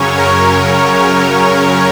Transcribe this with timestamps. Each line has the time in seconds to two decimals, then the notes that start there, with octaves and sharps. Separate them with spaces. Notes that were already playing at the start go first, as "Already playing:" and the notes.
Already playing: F#2 C#3 F#3 C#4 C#5
0.17 A#4